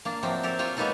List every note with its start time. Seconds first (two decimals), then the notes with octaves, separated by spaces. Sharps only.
0.05 A#3 D4
0.23 C3 F3 F#3 C4
0.43 G4 A4 A#4
0.59 F4 C5 C#5 G5
0.77 G#3 A#3 B3 C#4 D#4 A4